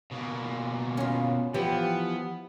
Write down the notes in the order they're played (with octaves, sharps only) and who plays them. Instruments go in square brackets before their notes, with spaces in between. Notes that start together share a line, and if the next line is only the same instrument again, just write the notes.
[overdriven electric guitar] B2 A#3
[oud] C#4 F4
[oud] E3 F3 G4 [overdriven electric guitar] B3